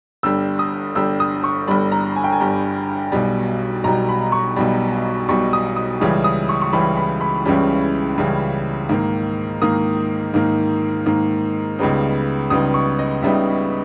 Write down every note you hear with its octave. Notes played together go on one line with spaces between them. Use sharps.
G1 G2 G3 E6
D#6
G1 G2 G3 E6
D#6
C#6
G1 G2 G3 B5
A#5
G#5
G5
G#5
G1 G2 G3
B1 B2 G3
B1 B2 G3 A#5
B5
C#6
B1 B2 G3
B1 B2 G3 C#6
D#6
D#6
C#2 C#3 E3 G3 C#4
D#6
C#6
C#6
C#2 C#3 E3 G3 C#4 B5
B5
B5
C#2 C#3 E3 G3 C#4
C#2 C#3 E3 G3 C#4
G#2 D#3 A#3
G#2 D#3 A#3 D#6
G#2 D#3 A#3
G#2 D#3 A#3
C#2 C#3 G3 B3 D#4
C#2 C#3 G3 B3 D#4 D#6
C#6
D#5
C#2 C#3 G3 B3 D#4 E5